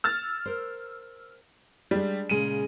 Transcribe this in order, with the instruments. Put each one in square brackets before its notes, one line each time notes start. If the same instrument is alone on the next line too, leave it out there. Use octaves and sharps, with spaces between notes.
[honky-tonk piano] E6 F6 A6
[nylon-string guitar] A#4 C5
[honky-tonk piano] G3 [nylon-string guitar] G#3 D4
[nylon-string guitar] A#2 C#3 G#3 [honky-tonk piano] D#7